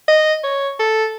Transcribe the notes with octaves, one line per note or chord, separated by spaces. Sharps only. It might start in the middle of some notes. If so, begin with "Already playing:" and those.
D#5
C#5
A4